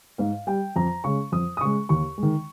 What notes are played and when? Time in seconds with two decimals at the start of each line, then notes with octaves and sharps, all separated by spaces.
0.18 G#2 F5
0.47 G3 G5
0.76 F2 A#5
1.04 C#3 G#3 C#6
1.32 F2 D#6
1.57 D#6
1.61 C#3 G#3 C#6
1.89 D#2 C#6
2.18 G#3
2.23 D#3